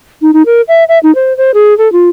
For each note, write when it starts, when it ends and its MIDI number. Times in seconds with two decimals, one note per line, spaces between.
0.22 0.31 63
0.33 0.42 63
0.46 0.61 70
0.68 0.84 76
0.89 0.99 76
1.03 1.14 63
1.15 1.36 72
1.37 1.51 72
1.54 1.76 68
1.78 1.91 69
1.93 2.09 65